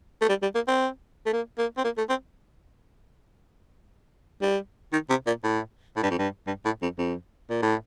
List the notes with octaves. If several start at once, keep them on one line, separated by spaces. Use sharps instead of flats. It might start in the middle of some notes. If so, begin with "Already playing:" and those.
A3
G3
G3
A#3
C4
A3
A#3
A#3
C4
A#3
A3
C4
G3
D#3
C3
A#2
A2
A2
G2
F2
G2
G2
A2
F2
F2
A#2
A2